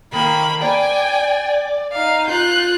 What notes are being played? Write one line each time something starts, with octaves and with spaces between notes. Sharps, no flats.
D#3 A#3 B5
D5 G5 G#5
D#4 F5
F4 F#6 G6